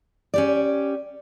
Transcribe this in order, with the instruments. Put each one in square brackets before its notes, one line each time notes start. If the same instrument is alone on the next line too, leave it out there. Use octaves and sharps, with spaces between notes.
[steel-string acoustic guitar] C#4 G4 D5